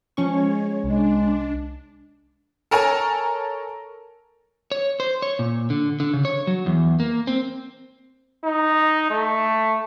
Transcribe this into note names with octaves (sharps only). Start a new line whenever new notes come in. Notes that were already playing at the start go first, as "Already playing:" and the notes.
F3 G#3 C#4 C#5 C#6
C2 G#3 D4
A4 A#4 C#5 G#5 A#5
C#5
C5
C#5
A#2
D3
D3
C#3
C#5
F#3
E2
A#3
C4
D#4
A3